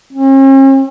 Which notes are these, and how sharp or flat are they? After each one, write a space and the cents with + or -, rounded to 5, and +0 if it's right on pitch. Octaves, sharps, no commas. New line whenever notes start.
C#4 -45